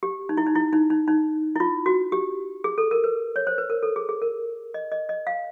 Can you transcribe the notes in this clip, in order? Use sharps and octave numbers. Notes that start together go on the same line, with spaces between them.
G4
D#4
E4
D#4
E4
D#4
D#4
D#4
E4
F4
F#4
G4
G#4
A4
A#4
B4
C#5
C5
B4
A#4
A4
G#4
G#4
A#4
D#5
D#5
D#5
F5